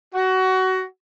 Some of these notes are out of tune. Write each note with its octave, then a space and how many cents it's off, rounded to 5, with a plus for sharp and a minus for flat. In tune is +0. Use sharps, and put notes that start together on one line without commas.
F#4 +20